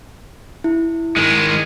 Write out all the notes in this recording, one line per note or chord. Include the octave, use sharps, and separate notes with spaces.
E4
D#3 G#3